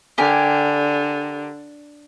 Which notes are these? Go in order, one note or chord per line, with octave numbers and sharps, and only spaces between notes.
D3 G4 A#4 G#5